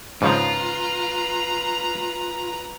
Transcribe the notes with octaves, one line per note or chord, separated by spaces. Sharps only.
G#2 C#3 F3 F4 B4 A#5